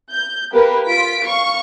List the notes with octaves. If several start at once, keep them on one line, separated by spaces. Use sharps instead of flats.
G6
A#3 G4 A#4 B4
F4 B6 D7
F5 C#6